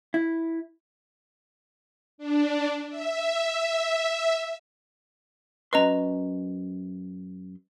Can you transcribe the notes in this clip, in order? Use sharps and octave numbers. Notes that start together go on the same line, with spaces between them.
E4
D4
E5
F#2 C#4 B4 D#5 A#5 C6